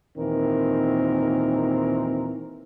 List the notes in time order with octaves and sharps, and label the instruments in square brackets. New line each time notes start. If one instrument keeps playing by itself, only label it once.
[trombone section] D#2 A#2 D#3 E3 C4 A#4